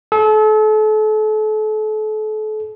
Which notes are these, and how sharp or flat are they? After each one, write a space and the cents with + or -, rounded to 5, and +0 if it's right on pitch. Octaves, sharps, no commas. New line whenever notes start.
A4 -35